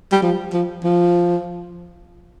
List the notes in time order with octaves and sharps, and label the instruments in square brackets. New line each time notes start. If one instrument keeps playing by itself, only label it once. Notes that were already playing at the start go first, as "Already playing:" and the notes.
[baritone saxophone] G3
F3
F3
F3